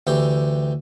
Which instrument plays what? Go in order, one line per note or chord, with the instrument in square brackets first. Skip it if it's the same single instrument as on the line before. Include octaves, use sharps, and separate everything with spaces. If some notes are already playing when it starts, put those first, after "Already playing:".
[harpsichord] D2 E3 G4